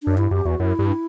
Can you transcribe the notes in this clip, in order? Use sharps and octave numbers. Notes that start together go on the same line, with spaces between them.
F#2 D4
G2 E4
F#2 G4
E2 F#4
F#2 E4
G2